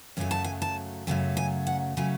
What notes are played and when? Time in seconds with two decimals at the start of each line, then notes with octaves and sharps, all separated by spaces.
0.17 F#2 C#3 F#3 A3 G#5
0.31 A5
0.44 G#5
0.62 A5
1.07 F#2 C#3 F#3 A3 G#5
1.37 G#5
1.67 F#5
1.97 C#3 F#3 A3 G#5